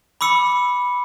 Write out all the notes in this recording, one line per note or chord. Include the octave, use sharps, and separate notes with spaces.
B5 D6 E6 C#7